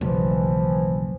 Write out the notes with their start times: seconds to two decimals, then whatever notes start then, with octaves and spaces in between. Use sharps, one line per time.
0.01 F#1 B1 E3 F3 G3